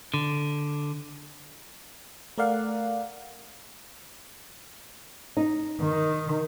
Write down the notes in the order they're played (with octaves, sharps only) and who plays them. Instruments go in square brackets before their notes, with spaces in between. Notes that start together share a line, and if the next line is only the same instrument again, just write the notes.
[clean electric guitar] D3
[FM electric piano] A3 A#4 D5 F5 F#5
[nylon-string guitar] D#4
[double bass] D#3